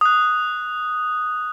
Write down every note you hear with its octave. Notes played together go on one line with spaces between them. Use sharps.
D#6 F#6